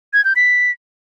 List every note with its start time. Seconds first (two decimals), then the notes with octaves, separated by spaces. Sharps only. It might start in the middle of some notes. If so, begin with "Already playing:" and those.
0.13 G#6
0.25 G6
0.36 B6